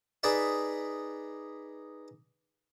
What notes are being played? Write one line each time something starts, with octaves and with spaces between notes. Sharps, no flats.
D#4 G#4 B4 D5 E5